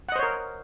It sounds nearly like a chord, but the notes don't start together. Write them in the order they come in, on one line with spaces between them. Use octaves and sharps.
F#5 D#5 C5 C#5 A#4